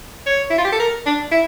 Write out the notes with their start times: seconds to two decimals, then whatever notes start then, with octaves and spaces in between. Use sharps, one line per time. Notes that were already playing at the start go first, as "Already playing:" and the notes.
0.26 C#5
0.50 E4
0.58 F4
0.64 G4
0.72 A4
0.79 A#4
1.06 D4
1.31 E4